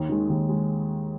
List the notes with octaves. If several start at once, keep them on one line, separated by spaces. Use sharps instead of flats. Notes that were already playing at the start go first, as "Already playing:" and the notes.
Already playing: D#2
D#3 G#3
D#2
G#3